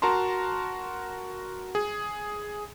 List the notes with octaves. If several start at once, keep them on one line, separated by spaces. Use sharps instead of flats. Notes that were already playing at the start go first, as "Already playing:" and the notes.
F#4 A#4 A5 A#5 C6
G#4